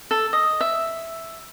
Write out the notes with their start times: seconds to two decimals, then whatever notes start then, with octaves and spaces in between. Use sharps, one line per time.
0.11 A4
0.33 D#5
0.61 E5